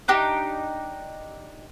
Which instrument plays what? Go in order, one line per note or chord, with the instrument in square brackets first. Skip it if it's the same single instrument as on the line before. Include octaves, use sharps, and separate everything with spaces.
[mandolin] D4 D#4 G4